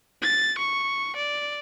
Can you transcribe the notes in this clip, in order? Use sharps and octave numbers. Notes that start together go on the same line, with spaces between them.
A6
C#6
D5